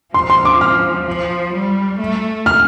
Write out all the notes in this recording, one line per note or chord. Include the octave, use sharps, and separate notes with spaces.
F3 C6
C6
D6
F6
F3
G3
A3
F6